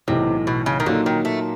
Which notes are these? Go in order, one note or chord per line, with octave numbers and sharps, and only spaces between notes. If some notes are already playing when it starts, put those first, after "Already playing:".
B1 A2 C3 E3
B2
C#3
D#3
A#2 D3 F#3 A#3 D#4
D#3
A3